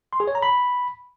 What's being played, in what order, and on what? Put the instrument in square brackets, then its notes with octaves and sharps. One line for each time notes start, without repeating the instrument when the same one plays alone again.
[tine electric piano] C6
G#4
C#5
A#5
B5